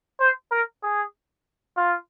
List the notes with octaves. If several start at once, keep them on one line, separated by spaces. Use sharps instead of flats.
C5
A#4
G#4
F4